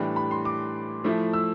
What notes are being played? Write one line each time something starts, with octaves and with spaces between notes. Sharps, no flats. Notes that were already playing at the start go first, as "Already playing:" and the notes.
Already playing: A2 E3 G3 D4 B5
B5
C6
D6
F3 A3 E4
E6